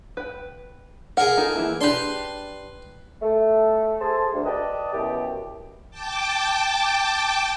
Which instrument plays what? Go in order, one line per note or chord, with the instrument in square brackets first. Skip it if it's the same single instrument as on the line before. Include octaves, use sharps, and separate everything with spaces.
[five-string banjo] B4 G5
[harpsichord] G#4 A#4 [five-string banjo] F#5
[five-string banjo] D#4 F4 A4
E3 A#3 E4
[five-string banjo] D4 G4 [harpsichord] B4 C6
[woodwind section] A3
G#4 A4 C5 A5
D2
B4 D5 D#5 G5 A5
F#2 B2 E3 G4
[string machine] G5 A5 D6